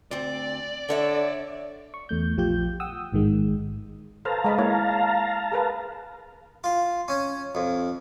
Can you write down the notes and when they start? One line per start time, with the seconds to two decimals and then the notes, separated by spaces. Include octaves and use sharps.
0.11 D2 C4 D5
0.89 D3 D4 C#5 E5
1.94 C#6
2.09 E2 A3 G6
2.37 A#1 F3 F4 G4 G6
2.80 F#5 G5 D#6 E6
3.12 A1 G#2 D#3 G#3
4.25 A4 B4 C5 F5 A5 A#5
4.44 G#3 D#5 B5
4.58 A#3 E4 C#5
5.52 G#4 A#4 B4
6.64 F4
7.08 C#4
7.55 F2